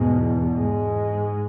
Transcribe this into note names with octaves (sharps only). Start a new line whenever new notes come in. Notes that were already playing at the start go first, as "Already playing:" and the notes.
Already playing: E2 G#2 B2 G#3
G#2 G#3